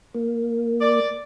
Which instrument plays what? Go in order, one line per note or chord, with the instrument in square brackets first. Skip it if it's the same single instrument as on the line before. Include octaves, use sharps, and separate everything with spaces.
[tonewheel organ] A#3
[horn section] D5